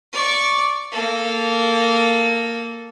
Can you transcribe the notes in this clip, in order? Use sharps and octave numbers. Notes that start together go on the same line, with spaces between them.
D5 C#6
A#3 A4